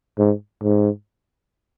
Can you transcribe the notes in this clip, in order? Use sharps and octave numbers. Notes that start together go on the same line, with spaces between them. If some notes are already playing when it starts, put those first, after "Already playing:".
G#2
G#2